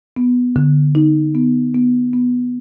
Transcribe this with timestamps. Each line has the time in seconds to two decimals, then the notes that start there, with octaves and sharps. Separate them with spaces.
0.17 B3
0.56 D3
0.95 D#4
1.35 B3
1.74 B3
2.13 B3